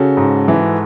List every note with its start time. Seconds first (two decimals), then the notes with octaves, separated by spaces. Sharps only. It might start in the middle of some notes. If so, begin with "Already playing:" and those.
Already playing: C#3 F#4 A4
0.17 G#2
0.48 E3